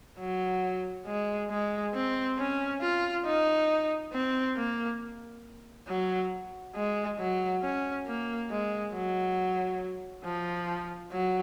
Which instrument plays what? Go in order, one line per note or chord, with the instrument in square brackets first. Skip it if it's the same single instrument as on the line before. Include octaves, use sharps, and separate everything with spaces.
[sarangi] F#3
G#3
G#3
C4
C#4
F4
D#4
C4
A#3
F#3
G#3
F#3
C#4
A#3
G#3
F#3
F3
F#3